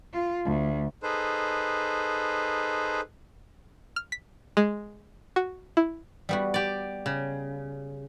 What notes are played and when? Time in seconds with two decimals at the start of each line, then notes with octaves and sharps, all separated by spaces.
0.14 F4
0.46 D2
1.03 D#4 G#4 A4 B4 C5
3.96 F6
4.12 B6
4.57 G#3
5.36 F#4
5.77 E4
6.29 G3 B3 F#4
6.54 G4 D5
7.06 C#3